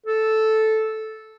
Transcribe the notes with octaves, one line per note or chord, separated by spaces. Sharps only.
A4